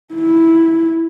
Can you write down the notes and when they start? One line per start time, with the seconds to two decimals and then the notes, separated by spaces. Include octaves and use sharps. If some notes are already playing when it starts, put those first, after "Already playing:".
0.14 E4